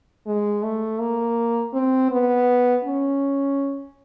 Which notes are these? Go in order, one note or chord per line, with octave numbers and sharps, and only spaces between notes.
G#3
A3
A#3
C4
B3
C#4